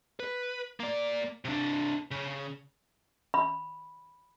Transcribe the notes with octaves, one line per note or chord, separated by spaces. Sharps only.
B4
A#3 D5
C3 D4
C#3
B5